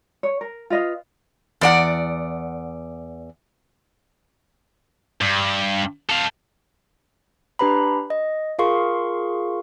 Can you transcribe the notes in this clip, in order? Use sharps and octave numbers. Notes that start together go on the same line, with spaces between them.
C#5
A#4
F4 B4 D#5 F5
E2 D5 F#5
G2
A4 F5
D4 G4 B4 A#5 B5
D#5
F4 G#4 A#4 F5 C6 C#6